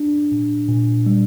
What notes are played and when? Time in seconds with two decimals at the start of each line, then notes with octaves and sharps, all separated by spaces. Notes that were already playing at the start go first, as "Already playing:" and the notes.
Already playing: D4
0.32 A#2
0.68 A#2
1.06 G3